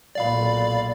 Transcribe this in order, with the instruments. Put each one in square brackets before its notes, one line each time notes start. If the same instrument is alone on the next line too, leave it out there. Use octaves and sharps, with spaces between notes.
[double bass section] B1 A#2 [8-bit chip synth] D5 F5 B5